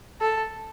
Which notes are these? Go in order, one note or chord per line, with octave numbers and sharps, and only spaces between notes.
A4